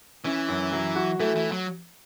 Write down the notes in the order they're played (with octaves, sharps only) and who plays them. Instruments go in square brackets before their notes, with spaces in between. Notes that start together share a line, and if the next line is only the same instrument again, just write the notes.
[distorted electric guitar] E3 [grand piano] C#4
[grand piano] F#2
F#3
F#4
[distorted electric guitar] E3 [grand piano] A3
[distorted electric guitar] E3
F#3